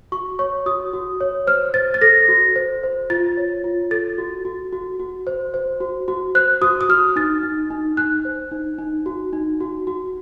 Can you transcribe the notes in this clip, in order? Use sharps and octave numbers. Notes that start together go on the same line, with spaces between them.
F#4 C#6
C#5 C#6
F#4 D#6
F#4
C#5
C5 F6
C5 A6
A6
A4 A#6
F#4
C5
C5
F4 A6
C#5
F4
A4 A6
F#4
F#4
F#4
F#4
C5
C5
F#4
F#4
C5 F#6
F#4 D#6
D#6
F#4 F6
D#4 A6
D#4
D#4
D#4 F#6
C5
D#4
D#4
F#4
D#4
F#4
F#4